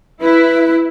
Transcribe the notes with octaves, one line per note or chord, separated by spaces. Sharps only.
E4 B4